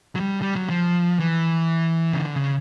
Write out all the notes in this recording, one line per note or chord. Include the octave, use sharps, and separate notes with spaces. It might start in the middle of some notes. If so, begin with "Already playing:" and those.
F#3
G3
G3
F#3
F3
E3
C#3
D3
C#3